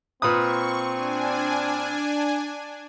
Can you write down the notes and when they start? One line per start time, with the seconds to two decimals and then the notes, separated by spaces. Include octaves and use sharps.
0.22 A#2 C4 B4 C#6 D#6
0.89 D4 G#5